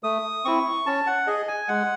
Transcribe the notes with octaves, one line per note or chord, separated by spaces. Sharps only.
A3 D#6
C4 E4 C#6
C#4 A5
F#5
G#4 D#5
G#5
G#3 F#5